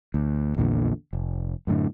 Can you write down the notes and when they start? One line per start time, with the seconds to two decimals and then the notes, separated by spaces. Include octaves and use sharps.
0.14 D2
0.57 A#1 E2 A#2 D3
1.13 F1
1.67 F#2 A2 D3